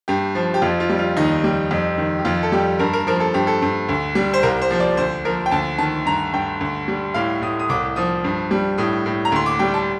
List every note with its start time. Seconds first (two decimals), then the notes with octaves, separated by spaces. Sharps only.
0.08 G2 G4
0.35 F3
0.54 G4
0.62 F2 F4
0.80 F4
0.89 G3
0.99 F4
1.17 D#2 D#4
1.44 G3
1.71 F2
1.98 D#3
2.19 G4
2.25 F2 F4
2.43 A4
2.52 G3 G4
2.79 G2 A#4
2.93 A#4
3.07 F3 A#4
3.20 A4
3.34 G2 G4
3.47 A4
3.62 G2
3.89 D2
4.15 G3
4.34 C5
4.43 C2 A#4
4.62 C5
4.71 F3
4.80 D5
4.97 D2 C5
5.25 F3 A#4
5.46 G5
5.51 D2 A5
5.78 D#3 A5
6.06 G2 A#5
6.33 G2 G5
6.61 D2
6.88 G3
7.14 A2 F5
7.42 A2 D#6
7.59 D#6
7.69 C2 D6
7.96 F3 D#6
8.24 G2
8.51 G3
8.78 A2 D#6
9.06 A2
9.25 A#5
9.32 D2 C6
9.46 D6
9.59 G3 G5
9.74 A5